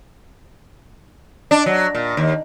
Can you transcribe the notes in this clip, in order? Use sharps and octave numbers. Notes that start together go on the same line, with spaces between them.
D4
F#3
A#2
D#2